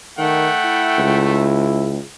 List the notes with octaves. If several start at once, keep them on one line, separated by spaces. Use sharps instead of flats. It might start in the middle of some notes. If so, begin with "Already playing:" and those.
D#3 A3 F#5 G5
E4
C#2